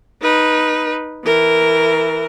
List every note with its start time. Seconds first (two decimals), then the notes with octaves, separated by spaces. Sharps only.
0.22 D#4 B4
1.25 E3 A#4